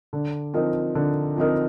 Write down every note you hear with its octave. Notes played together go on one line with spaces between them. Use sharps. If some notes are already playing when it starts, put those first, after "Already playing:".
D3
F3 C4 D#4 A#4
D3
F3 C4 D#4 A#4